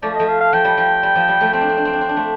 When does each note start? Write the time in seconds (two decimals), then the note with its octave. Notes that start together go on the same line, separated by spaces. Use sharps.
0.02 F3 A3 D5
0.15 F3 A3 D#5
0.28 F5
0.40 F5
0.53 F3 G5
0.65 G3
0.77 F3
1.03 G3
1.15 F3
1.28 G3
1.41 F3 A3
1.53 C4 G5
1.61 D4
1.69 C4
1.77 D4
1.85 C4
1.93 D4
2.01 C4
2.09 D4
2.16 A3 C4